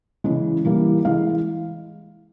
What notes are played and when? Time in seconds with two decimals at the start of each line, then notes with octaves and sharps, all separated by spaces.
0.24 C#3 E3 G#3
0.65 E3 G3 A#3
1.05 E3 G#3 F5